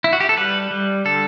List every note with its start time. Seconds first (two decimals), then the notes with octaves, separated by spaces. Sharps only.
0.04 E4
0.13 F#4
0.20 G4
0.29 A4
0.37 G3 B4
0.71 G3
1.05 D3 A4